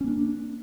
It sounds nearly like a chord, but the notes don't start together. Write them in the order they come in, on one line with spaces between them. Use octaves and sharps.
C#4 A#3 D4